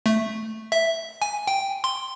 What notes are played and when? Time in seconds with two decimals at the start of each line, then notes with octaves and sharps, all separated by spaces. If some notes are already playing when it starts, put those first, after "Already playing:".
0.06 A3
0.72 E5
1.22 G#5
1.47 G5
1.84 C6